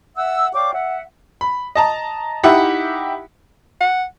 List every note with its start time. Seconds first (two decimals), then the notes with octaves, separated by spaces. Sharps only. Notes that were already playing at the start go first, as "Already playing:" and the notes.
0.17 E5 F#5 E6
0.54 C#5 D5 F5 G5 D6
0.74 E5 F#5
1.41 B5
1.75 D#5 A5 A#5
2.43 D#4 E4 G4 E5 F#5 B5
3.81 F#5